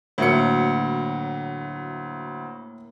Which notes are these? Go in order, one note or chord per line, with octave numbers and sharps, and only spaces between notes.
D2 A2 F#3 A#3 E6 C#7